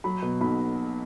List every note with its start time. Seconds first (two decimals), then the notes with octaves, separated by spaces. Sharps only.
0.04 F#3 B5
0.22 B2
0.41 B1 B5